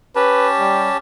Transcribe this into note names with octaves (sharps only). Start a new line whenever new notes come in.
C#4 G4 B4 A5
G3